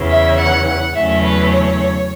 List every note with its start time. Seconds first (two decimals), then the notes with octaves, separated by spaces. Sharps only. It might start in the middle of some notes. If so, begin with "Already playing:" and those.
Already playing: E2 C#3 E3
0.10 E5
0.39 F#5
0.67 F#5
0.95 E2 C#3 F#3 A3 C#4 E5
1.24 B4
1.52 C#5